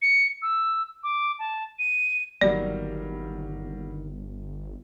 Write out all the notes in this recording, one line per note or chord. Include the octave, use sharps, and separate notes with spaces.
C#7
E6
D6
A5
D#7
G1 C3 D#3 F#3 G3 A#3 D5